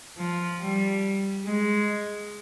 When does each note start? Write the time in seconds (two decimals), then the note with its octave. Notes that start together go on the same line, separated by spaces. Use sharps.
0.18 F3
0.61 G3
1.44 G#3